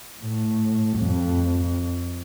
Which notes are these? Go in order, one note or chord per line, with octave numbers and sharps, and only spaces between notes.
A2
F2